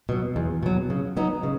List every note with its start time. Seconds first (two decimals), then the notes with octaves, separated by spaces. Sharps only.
0.09 B2 F#3
0.36 E2
0.63 B2 F#3
0.90 C#3
1.17 F#3 B3 D#4
1.43 C#3